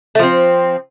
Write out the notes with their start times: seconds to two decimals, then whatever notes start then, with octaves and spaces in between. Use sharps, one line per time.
0.15 A3
0.19 F3
0.23 C4